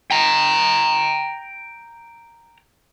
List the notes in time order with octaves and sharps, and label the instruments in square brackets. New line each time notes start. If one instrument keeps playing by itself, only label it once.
[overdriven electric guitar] G5 A#5